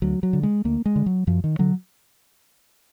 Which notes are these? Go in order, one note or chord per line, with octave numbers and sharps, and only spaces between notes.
D2 F#3
F#3
D3
G#3
D2 A#3
G#3
D3
F#3
F#2 F3
D#3
D3 F#3